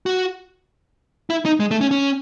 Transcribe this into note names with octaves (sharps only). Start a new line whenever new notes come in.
F#4
E4
D#4
G#3
A3
C#4
C#4